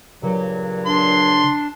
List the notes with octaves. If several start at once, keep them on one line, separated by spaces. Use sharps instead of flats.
G2 A#2 C#3 F#3
D4 C6